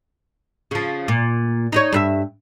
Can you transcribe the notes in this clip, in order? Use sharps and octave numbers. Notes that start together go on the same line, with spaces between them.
C#3 F3
A#2
D#4 C5 C#5
G2 B4 E5